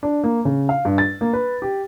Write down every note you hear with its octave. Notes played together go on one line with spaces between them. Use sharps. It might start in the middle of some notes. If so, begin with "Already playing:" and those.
D4
A#3
C#3
F5
G2
A6
A#3
B4
G4